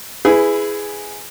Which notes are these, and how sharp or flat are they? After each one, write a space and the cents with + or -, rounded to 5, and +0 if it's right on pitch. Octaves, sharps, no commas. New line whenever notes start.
E4 +0 G#4 +0 B4 +25